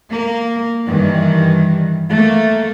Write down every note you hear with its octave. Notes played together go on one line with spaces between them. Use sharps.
A#3
G2 D#3 E3
A3 A#3